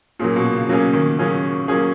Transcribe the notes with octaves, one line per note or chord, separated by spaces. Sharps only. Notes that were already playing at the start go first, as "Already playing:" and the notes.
A#2 F#3 A#3 C#4 G#4
B2
C#3
C#3 F#3 A#3 C#4 G#4
D#3
F#3 A#3 C#4 G#4
F#3 A#3 C#4 G#4